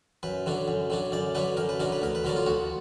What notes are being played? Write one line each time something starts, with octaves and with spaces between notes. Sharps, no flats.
F#2 B4
D3 F#3 D4
F#2
D3 F#3 D4
F#2 D5
D3 F#3 D4 B4
F#2 A#4
B4
D3 F#3 D4 A#4
B4
D2 A#4
B4
D3 F#3 D4 A#4
F4
D2 F#4